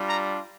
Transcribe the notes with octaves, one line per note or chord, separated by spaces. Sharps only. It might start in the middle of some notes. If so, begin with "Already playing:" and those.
Already playing: G3 D4 F4
A#5